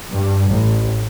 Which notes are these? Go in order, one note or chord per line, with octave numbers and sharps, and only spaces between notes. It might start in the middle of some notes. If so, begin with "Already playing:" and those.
G2
A1